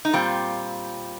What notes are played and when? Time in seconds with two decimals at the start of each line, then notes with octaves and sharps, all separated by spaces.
0.05 D#4
0.13 A#2 G3 C4 F4